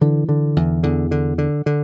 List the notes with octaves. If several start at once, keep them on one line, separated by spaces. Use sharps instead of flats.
D3 E3
D3
E2
E2 D3
D3
D3
D3